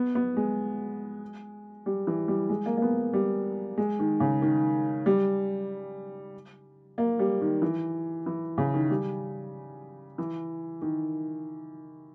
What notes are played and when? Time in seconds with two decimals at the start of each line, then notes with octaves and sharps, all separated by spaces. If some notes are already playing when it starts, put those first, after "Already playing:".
Already playing: B3
0.15 B3
0.37 G#3
1.86 G3
2.07 E3
2.28 G3
2.49 G#3
2.66 A#3
2.77 A#3
2.82 B3
3.13 G3
3.78 G#3
3.99 D#3
4.20 C#3
4.42 D#3
5.06 G3
6.98 A#3
7.19 G3
7.41 D#3
7.62 E3
8.26 E3
8.58 C#3
8.74 D#3
8.90 G3
10.18 E3
10.82 D#3